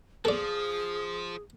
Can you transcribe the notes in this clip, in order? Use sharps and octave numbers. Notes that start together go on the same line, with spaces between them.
F3 G#4 A4 D5